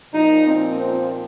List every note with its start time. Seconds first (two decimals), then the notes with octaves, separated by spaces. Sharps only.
0.13 A#2 F3 D#4
0.46 C4
0.78 C4